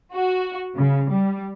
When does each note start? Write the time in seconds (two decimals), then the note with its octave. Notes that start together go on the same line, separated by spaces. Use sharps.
0.13 F#4
0.77 C#3
1.10 G3